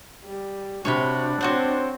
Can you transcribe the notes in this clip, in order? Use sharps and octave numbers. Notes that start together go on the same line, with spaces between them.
G3
C3 D4 F#4 C#5 G5 B5
C4 F#4 C5 C#5 F#5